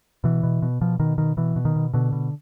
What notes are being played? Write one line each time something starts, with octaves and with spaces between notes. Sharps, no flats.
B2 E3
B2
B2
B2 F3
B2 D#3
B2 D#3
B2 E3
B2
D#3
B2
B2 D3
B2